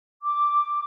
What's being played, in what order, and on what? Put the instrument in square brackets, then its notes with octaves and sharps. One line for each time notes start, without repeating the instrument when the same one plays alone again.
[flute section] D6